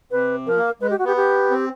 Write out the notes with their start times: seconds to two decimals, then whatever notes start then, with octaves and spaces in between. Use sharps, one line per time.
0.11 C3 B4
0.47 F3 A#4
0.57 A#3
0.81 G#3 B4
0.90 G4
0.99 F#4
1.05 B3 G4
1.16 G4
1.51 C4